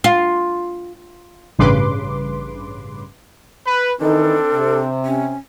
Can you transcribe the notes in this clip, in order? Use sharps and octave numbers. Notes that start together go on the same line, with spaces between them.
F4
A1 G2 C#3 B4 C6 D6
B4
D#3 E3 C4 D4 D#4 A4
C3
C#4